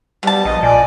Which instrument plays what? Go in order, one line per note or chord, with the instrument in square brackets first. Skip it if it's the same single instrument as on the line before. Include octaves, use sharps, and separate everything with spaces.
[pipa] B2 A5 [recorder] G3
[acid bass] A#1 [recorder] D#5
[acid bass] A#2 [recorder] D5 [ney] G#5